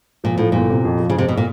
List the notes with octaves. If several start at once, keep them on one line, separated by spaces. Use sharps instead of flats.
A#2 F3
A2 F3
G1 A#2
C3
F2
F3
C#3
F2 C3
B2
A#2